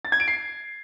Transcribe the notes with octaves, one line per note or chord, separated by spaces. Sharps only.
A6
G#6
D7
C7